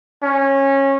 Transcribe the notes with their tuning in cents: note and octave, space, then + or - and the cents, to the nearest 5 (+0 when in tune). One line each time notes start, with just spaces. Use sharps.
C#4 -20